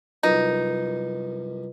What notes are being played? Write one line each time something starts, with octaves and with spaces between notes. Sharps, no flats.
C2 F#2 D#4 F4 B4 D#5